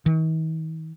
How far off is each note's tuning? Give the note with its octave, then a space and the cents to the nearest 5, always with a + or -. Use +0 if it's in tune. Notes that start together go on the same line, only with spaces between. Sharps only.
D#3 +45